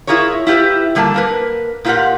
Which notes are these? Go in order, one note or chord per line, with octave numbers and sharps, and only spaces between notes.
E4 F4 G#4 A#4 C#5
E4 F4 G4 B4 E5
D3 G3 A#3 G5 A5
A#3 A#4 B4
A#2 E4 F4 G4 A#4 F#5